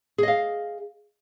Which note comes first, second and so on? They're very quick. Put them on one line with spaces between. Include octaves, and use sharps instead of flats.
G#4 D#5 F5